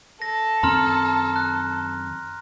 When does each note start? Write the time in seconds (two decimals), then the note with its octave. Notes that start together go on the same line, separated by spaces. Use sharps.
0.22 A4 A#6
0.63 F#2 D#3 C4 A#5 C6 F6
1.36 F#6